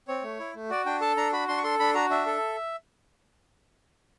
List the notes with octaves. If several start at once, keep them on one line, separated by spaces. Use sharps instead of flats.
C4 C#5
A3
E4
A3
F#4 D5
D4 G5
A4 A5
D4 A#5
F#4 B5
D4 C6
C#6
A4 C6
D4 B5
F#4 A#5
D4 E5
A4